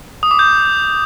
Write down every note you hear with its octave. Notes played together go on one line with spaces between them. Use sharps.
D#6
D6
G6